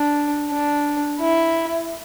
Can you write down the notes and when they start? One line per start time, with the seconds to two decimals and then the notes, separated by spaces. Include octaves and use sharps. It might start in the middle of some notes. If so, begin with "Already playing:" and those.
Already playing: D4
0.50 D4
1.20 E4